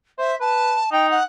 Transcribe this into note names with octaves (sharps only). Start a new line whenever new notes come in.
C5 E5
B4 A5
D#4 G5
F#5